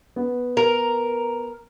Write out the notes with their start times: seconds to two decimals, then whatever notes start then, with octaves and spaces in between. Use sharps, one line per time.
0.16 B3
0.57 A#4